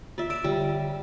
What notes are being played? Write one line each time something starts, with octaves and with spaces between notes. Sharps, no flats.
F4 D5 E5
D5 E6 D7 E7
D3 G3 F4